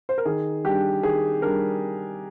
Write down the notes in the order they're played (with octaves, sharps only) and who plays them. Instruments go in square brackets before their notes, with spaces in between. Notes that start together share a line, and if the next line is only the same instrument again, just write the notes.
[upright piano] C5
A#4
D#3 G#4
G3 D4 G4
D#3 G#4
G3 D4 A#4